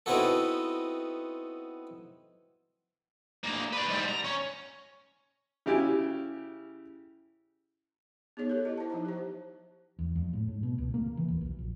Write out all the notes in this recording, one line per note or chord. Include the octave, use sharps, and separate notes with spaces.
B3 C4 D#4 E4 F#4 A4
D2 A#3
B4 D5
G#2 G3
A#5
C#4
C#3 E4 G4 G#5
B3 D#4 G#4 C#5
G4 A4
E4 D#5
C5 A5
F3 D#4 A#5
G4 C5
E2
F2
A2
G#2
B2
C#2
A#3
C#3
E3
D#1
B1
A#1